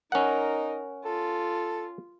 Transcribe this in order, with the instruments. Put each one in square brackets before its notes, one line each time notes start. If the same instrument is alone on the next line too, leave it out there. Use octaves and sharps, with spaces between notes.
[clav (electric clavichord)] C#4 F#5 [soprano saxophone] D#4 [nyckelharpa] A#4
[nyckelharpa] F4 [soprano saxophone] A4